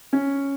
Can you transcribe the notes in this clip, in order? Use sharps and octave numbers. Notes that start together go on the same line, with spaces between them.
C#4